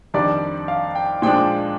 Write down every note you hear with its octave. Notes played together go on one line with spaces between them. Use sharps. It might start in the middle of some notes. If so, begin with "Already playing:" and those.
F2 D#3 G3 D4 D5
F5
G5
A#2 F3 G#3 D4 G5